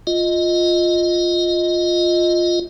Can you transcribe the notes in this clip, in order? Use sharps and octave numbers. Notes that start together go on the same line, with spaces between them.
F4 D#5